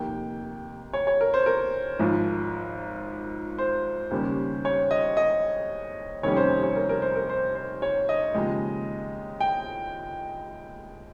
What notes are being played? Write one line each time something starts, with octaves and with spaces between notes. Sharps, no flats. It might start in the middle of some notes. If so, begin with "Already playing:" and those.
Already playing: F1 D#2 D#3 A#3 G5
C#5
C#5
A#4
C5
A#4
G#1 G#2 F3
C5
D#2 C#3 G3 A#3 C#4
C#5
D#5
D#5
F1 D#2 D#3 G3 C#4 C#5
C5
C#5
A#4
A#4
C5
A#4
C5
C5
C#5
D#5
D#2 C#3 F3 G#3
G5